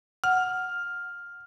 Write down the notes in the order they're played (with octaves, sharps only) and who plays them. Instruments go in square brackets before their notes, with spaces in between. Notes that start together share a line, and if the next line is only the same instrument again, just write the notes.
[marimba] F#5 [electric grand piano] F6